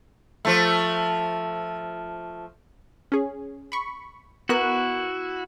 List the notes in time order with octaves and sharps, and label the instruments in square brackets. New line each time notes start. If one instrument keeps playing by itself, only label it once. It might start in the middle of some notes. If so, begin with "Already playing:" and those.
[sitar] F3 A3
[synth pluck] C#4 G#4
B5 C#6
[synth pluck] B3 A#4 F#6 [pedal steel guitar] E4 F#4